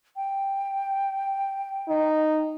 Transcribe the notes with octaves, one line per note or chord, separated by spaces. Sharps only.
G5
D#4